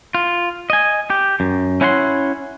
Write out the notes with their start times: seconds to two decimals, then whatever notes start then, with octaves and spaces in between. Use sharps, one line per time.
0.15 F4
0.70 D#5 G#5
1.10 G4
1.40 F#2
1.81 C#4 E4 C#5 F#5 A#5 C6